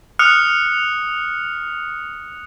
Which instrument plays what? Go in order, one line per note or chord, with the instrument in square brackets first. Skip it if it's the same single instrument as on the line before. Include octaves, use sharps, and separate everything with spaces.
[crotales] D#6 F6 F#6 C#7 F7